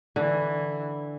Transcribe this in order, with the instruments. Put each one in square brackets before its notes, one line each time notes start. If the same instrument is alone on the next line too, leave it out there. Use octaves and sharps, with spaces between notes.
[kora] D3 [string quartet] E3